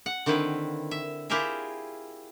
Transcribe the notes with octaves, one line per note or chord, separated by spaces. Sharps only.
F#5
D3 D#3 C4 E4 B4
E5
E4 F4 G4 G#4 A#4 E5